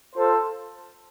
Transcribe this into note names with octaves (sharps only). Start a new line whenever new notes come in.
F4 A4 C5